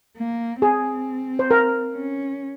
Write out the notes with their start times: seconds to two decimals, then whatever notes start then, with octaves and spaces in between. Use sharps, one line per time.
0.18 A#3
0.62 C4 G#4
1.39 C5
1.51 A#4
1.95 C#4